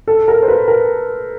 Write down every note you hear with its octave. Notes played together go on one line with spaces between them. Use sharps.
A4
A#4
C5
B4
A#4